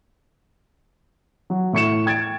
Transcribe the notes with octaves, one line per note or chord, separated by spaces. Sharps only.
F#3 F#4
A2 C#6 C#7 E7
G5 G#6 A6 D7